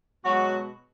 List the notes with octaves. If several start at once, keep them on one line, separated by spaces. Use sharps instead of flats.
B2 F#3 G#3 F#4